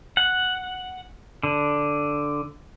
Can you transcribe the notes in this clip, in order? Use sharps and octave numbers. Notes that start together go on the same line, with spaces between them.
F#5
D3